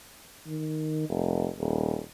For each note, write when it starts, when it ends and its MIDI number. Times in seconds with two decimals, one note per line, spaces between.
0.47 1.07 51
1.09 1.48 29
1.59 2.00 27